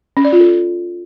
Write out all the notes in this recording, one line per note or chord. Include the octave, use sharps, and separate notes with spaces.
C#4
D5
F4
A4